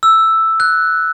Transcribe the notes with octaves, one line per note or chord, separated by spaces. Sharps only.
E6
F#6